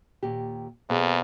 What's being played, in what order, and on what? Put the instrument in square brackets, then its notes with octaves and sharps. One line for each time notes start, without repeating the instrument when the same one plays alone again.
[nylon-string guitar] D#2 A#2 G4
[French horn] F2 [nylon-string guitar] B2 B3 G#4